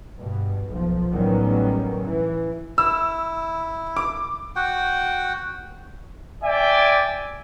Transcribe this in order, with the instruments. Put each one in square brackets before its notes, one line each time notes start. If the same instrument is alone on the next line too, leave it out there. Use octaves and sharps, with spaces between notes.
[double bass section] G2 B2
B1 F3
A1 D#3 F#3 G3 B3 C#4
E3
[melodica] E4 [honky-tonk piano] E6
[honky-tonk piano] D6
[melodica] F#4 F#5 G5
[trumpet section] D5 E5 G5 G#5